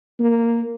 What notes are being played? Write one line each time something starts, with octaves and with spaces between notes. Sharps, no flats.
A#3